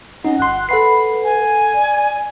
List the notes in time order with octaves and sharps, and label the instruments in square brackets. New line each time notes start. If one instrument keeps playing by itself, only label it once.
[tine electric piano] C#4 D#4 [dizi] D#5 [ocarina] F#5
[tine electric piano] G1 C6 [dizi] F#6
[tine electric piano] A4 F#5 C7 [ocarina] B4 [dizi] B5
[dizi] G#5
[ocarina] D5